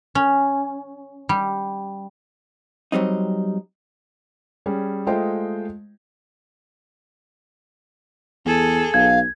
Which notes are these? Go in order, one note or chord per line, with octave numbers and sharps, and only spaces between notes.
C#4
G3
F#3 G3 C4 D#4
G3 C#4 G#4
G#3 A3 F4 C5 D#5 G5
E2 G#4 A4
B1 F5 G#6